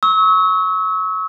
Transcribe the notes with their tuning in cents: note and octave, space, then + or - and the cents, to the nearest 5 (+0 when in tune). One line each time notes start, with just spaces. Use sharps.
C#6 +0 E6 -35